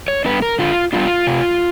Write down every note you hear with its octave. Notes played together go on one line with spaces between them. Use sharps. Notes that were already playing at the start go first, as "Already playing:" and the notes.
C#5
G3 B3 D4 B4
A#4
D3 F4
G3 B3 D4 F4
C3